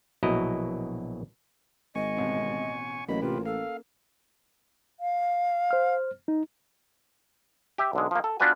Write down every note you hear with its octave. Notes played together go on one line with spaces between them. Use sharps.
A#1 B2 F#3 E4 D#5 A#5
G#1 D#5 G#5 C#6
A1 B2 C4
A1 F#3 A#3 C#4 D#5 B5
C3 F4 G4 B4
A4 F5
F5
C5 F6
D#4
G4 E5
B1 D3 G#3
F3 A#3
A4
B3 D4 F4 F#4 B4 G#5